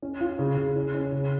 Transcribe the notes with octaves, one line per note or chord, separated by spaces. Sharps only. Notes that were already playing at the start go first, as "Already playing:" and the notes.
C#4
F4
C#3
C#3
C#4
C#4
C#3